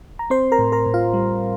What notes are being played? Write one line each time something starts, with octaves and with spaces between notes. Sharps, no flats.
A#5
C4 C5 C6
A#4 A#5
A2
A#4 A#5
A2
F4 F5
G3